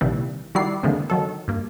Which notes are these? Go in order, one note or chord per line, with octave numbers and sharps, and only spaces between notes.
A#1 C3 D#3 E3 G3
D#3 G3 E4 F#4 D5 C7
D3 E3 G#3 A#3 C4
D#3 F#3 A4
G2 A#3